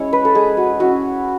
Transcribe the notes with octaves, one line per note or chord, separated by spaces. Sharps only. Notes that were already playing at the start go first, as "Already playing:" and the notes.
Already playing: G#3 C#4 E4 C#5
B4
A4
G#3 G#4
F#4
C#4 E4 F#4